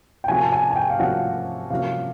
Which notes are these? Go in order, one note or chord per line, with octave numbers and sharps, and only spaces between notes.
G5
C3 F3 A#3 C#4 F#4 G#5
A5
G#5
G#5
G5
F5
C3 F3 A#3 C#4 F#4 F#5
C3 F3 A#3 C#4 F#4 F5